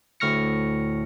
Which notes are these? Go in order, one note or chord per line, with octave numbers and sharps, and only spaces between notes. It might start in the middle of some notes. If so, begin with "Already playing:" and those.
D2 A2 C#6 F6 A#6 C#7